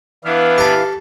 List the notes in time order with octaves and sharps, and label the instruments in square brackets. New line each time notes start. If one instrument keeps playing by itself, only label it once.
[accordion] E3 F5 [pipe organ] B3 D4 E4
[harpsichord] G4 A4